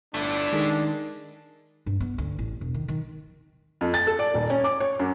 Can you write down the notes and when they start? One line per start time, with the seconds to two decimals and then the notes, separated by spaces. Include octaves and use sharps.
0.14 G1 A3 D4 E4
0.53 D#3 G#3
1.86 G2
2.00 B3
2.18 D2
2.39 A1
2.61 E1
2.74 D#3
2.88 D#3
3.81 F2
3.94 A6
4.07 A4
4.19 D5
4.34 D#1
4.50 C#4
4.64 D6
4.80 C#5
4.99 F#2